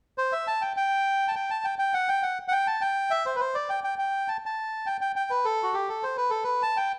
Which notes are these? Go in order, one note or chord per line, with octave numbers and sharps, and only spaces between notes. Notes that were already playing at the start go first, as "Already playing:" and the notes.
C5
E5
A5
G5
G5
A5
G5
A5
G5
G5
F#5
G5
F#5
F#5
G5
A5
G5
E5
C5
B4
C5
D5
G5
G5
G5
A5
A5
G5
G5
G5
B4
A4
F#4
G4
A4
C5
B4
A4
B4
A5
G5